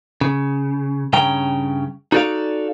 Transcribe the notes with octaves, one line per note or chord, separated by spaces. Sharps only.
C#3
G2 C#3 C#4 G5 A#5
D#4 F#4 A4 C#5 D5 F5